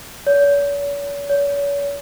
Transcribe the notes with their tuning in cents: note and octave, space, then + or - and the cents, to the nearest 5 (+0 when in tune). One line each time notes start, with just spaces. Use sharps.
C#5 +45
C#5 +40